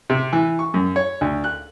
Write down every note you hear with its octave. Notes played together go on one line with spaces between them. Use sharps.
C3
E3
C#6
F#2
C#5
D2
F#6